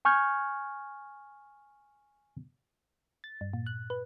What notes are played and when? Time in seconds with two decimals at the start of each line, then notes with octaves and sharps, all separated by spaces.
0.05 G#5 C#6 F6 G6 G#6
3.24 A6
3.41 G2
3.53 A#2
3.67 F#6
3.90 B4